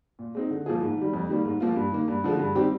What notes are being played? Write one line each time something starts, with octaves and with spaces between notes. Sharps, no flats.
A#2
G#3 C4 D#4
D3
F3 A#3 F4 G#4
G#2
D#3 G3
F2
D#3 G3 A#3
G#2
F3 A#3 F4
G2
D#3 A#3
G2
D3 F3 G#3
G2
D#3 G3 C4 G4